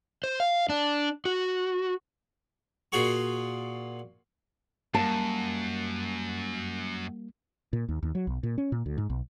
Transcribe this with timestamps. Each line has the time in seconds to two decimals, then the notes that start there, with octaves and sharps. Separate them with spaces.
0.24 C5
0.40 F5
0.69 D4
1.25 F#4
2.92 A#2 F4 F#4 G#4 C#6
4.94 F#2 G3 A#3 A5
7.73 A#2
7.89 D#2
8.03 D#2
8.15 F#3
8.27 B1
8.43 A#2
8.58 C#4
8.72 A#2
8.86 D2
8.98 G#2
9.10 B1